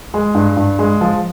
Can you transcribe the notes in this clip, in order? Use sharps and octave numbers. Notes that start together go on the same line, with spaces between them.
G#3
G2
G2
G#3
F3